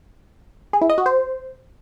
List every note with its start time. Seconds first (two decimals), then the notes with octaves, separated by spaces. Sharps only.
0.73 G#4
0.81 E4
0.90 D#5
0.98 F#4
1.06 C5